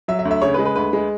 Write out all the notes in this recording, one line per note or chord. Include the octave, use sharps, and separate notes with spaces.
F#3 E5
E5
D2
E5
C#3 C#5
B4
G#3
B4
D2 B4
G#3